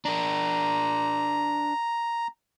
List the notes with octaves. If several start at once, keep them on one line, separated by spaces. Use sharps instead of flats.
D4 A#4 A#5